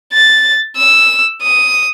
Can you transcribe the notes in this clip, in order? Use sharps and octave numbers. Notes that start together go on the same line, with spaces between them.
A6
E6
D#6